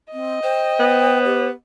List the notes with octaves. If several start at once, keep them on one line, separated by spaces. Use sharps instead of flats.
C4 D#5
C5 G5
B3
G4